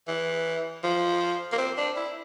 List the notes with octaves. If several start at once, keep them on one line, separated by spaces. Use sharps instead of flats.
E3
F3
A#3
C4
D4
E4